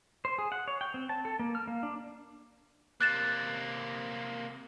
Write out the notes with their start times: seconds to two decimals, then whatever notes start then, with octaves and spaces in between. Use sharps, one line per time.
0.25 C5
0.38 G#4
0.52 F#5
0.68 C#5
0.81 G5
0.94 C4
1.09 A5
1.25 A4
1.39 A#3
1.55 F6
1.68 A#3
1.83 D4
3.01 C3 A#3 F#6 A6 E7